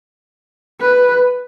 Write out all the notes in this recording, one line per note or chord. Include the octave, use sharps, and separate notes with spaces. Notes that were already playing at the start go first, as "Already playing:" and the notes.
B4